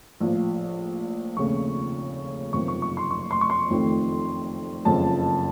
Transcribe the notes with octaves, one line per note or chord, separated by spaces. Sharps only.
A#1 A2 F3
F1 D#2 C#3 A3 C#6
F#1 F2 C3 D#3 A#3 C#6
C#6
C#6
C6
C#6
C6
C#6
C6
F1 F2 D#3 A3
F#1 F2 C#3 A5